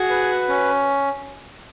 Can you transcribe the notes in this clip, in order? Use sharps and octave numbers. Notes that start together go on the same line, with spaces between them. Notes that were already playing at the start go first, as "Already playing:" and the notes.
Already playing: F#4 G#4
B4
C#4